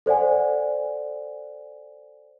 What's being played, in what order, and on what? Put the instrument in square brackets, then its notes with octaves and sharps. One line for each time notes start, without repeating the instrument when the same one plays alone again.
[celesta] A4 C5 D5 F#5 G#5